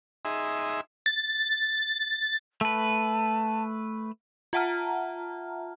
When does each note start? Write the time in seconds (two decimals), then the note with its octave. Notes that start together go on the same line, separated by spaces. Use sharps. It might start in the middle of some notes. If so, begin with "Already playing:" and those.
0.25 D#4 G#4 E5 C6
1.06 A6
2.61 A3 B4 A5
4.53 F4 E5 F#5 A5 A#5 F6